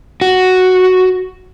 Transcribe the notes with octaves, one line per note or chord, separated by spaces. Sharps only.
F#4